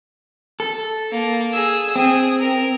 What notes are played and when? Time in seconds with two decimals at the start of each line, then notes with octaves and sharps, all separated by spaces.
0.60 A4
1.12 A#3
1.53 G#4 E6
1.96 C4 G#4 D#6
2.40 A#4